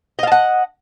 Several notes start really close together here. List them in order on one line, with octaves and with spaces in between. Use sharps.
D#5 F5 A5 F#5